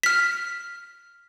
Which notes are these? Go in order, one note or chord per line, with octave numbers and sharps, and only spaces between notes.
F6 B6